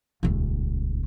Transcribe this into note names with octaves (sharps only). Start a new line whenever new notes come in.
D#1 C#2